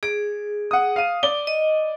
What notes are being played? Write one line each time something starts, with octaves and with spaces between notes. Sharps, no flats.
G#4 D7
F#5 D#6
F5 D#7
D5 G7
D#5